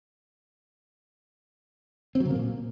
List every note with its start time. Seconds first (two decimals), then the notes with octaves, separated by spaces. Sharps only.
2.15 C4
2.20 F#3
2.25 C#3
2.30 A#3
2.35 A#2